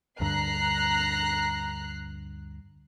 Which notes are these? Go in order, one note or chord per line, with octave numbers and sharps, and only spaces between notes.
D2 G2 D3 A#5 F#6 C7